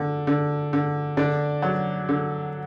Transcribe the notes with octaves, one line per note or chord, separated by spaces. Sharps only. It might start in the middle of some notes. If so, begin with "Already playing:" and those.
Already playing: D3
D3
D3
D3 D4 D5
F#3
D3